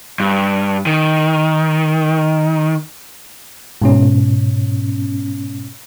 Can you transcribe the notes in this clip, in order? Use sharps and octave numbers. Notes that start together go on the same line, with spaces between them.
G2
D#3
G#2 B2 C#4